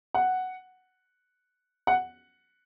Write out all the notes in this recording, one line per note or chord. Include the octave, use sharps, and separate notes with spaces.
F#5
F#5